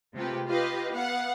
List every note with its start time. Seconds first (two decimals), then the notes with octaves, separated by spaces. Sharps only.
0.14 C3 G#3 A3 F4 G4 B4
0.47 F4 G4 B4 D#5 F5
0.91 B3 F5 F#5